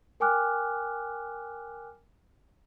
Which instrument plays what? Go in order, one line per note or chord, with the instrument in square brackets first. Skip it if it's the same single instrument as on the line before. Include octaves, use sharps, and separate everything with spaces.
[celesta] A#4 G5 G#5 D6 F6 F#6